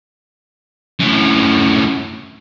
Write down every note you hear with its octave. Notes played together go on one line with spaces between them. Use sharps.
F#2 A2